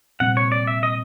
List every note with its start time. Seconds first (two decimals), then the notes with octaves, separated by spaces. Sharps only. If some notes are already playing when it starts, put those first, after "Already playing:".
0.20 A#2 G3 C4 F#5
0.37 C#5
0.52 D5
0.67 E5
0.83 D#5